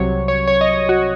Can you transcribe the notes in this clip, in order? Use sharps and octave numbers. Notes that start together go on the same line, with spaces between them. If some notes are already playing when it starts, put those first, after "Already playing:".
Already playing: C2 C3 F#3 C#5
C#5
C#5
D#5
F#4